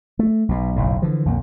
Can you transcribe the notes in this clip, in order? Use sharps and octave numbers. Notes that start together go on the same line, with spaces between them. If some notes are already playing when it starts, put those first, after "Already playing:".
A3
B1 B2
F#1 B1 A2
D3 E3 F3
B1 F2 G3 A#3